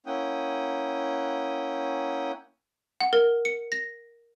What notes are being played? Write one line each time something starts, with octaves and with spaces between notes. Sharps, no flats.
A#3 C#4 E4 F#5 G5 D#6
F#5
A#4
C#7
A#6